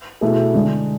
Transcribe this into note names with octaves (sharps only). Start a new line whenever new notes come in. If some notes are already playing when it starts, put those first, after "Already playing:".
B2 A3 E4 G#4
D3 G#3 D4